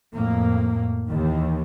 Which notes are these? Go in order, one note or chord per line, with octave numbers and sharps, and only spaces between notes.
F2 A2 A#3
D#2 D#3 E3